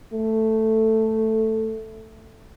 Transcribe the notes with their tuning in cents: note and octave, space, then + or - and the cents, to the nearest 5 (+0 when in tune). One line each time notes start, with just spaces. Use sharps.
A3 +5